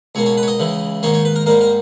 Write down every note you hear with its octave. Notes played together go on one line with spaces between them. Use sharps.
C#2 B2 A#3 C#5
C#5
B4
C#5
D#5
C#2 C#3 E3
G#2 D#3 A#3 C#5
C#5
B4
A#4
G#2 G3 A#3 A#4
A#4